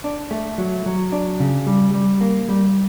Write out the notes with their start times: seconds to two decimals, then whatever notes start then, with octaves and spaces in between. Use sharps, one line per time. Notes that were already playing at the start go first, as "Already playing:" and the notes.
0.04 D4
0.31 A3
0.58 F#3
0.86 F#3
1.12 D4
1.40 C#3
1.67 G3
1.94 G3
2.21 A#3
2.49 G3